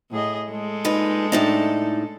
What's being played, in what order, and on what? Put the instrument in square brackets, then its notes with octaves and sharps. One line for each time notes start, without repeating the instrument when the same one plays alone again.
[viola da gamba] A2 G#4 D#5
G#3 A4
[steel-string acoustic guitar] A#2 D#4 B4
A2 D4 D#4